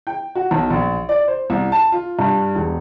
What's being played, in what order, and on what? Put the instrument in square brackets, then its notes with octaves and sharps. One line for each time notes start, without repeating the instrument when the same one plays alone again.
[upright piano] G5
F#4
B1
A#1
D5
C5
C2
A5
F4
G2
E1